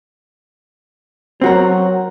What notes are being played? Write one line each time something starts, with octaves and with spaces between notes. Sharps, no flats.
F#3 C4 F#4 A#4